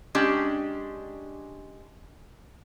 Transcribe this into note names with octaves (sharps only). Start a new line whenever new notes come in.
G#3 C#4 D4 G4